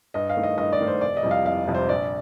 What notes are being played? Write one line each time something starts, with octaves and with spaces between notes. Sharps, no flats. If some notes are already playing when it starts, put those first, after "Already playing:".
G2 D#5
F5
D#3 A3
D#5
G2 D#5
D5
D#3 A3
C5
F1 D5
D#5
F2 C3 G3
F5
F1 F5
F2 C3 G3
C5
A#1 D5